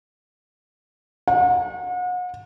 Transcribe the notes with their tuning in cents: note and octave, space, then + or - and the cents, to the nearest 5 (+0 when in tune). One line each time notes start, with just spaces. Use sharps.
F#5 -40